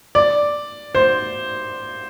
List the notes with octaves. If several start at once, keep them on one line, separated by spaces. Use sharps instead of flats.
D5
C5